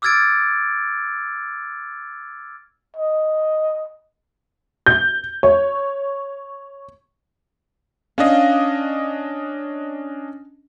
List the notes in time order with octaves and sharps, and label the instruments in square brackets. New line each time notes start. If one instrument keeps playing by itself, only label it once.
[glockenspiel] D6 E6 F6 G#6 A6 D7
[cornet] D#5
[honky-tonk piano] G6
C#5
[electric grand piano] C#4 D4 D#5 [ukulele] F5